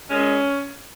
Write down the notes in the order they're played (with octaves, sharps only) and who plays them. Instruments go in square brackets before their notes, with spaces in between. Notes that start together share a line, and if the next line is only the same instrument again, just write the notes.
[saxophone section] A#2 G#3 C#4